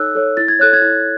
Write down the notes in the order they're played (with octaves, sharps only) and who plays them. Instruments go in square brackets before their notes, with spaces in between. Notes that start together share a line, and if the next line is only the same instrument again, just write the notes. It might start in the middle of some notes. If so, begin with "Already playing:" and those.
Already playing: [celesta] D#4 A4 C#5 E6 F#6
A4 C#5
E4 A6
G#6
A4 C#5 F#6
G#6
E4